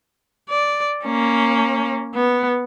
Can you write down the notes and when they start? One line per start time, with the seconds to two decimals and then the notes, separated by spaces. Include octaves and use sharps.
0.49 D5
1.04 A#3 C#4
2.15 B3